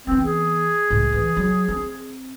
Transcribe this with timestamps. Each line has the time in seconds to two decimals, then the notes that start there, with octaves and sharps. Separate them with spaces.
0.07 E3 B3 C4
0.24 G#4
0.90 C#2 A2
1.12 E3
1.37 F#3
1.68 C4